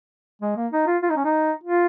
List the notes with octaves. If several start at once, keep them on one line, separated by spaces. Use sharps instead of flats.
G#3
A#3
D#4
F4
F4
D#4
C#4
D#4
F4